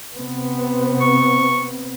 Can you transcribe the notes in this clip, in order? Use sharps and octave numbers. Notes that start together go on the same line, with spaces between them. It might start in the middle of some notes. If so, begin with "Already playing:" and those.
C3 B3 C4
C#6